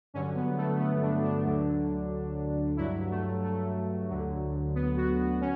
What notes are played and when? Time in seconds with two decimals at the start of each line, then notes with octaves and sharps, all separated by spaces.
0.14 G2 D3 F#3 C#4
0.35 B3
0.57 A3
0.79 B3
1.02 D4
1.23 D4
1.45 D2 D3 F#3
2.76 G2 F#3 E4
3.10 A3
3.43 A3
4.09 D2 D3 F#3
4.75 B3
4.97 F#4
5.18 B3
5.41 C#4